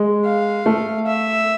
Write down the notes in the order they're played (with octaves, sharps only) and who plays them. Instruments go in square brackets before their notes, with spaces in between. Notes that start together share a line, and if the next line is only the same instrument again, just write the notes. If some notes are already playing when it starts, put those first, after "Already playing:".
Already playing: [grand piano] G#3
[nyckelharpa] F5
[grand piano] A3
[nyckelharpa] E5